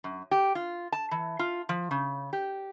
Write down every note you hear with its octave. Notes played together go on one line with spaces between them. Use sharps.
F#2
G4
F4
A5
E3
F4
F3
C#3
G4